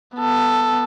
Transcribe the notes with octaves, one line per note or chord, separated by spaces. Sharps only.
B3 A4